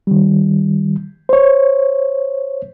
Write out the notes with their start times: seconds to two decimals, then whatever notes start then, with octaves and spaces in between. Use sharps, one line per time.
0.07 D#3 G3
1.29 C5 C#5